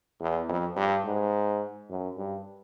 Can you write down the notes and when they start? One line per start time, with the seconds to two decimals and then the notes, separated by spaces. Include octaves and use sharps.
0.21 E2
0.49 F2
0.76 G2
1.05 G#2
1.89 F#2
2.17 G2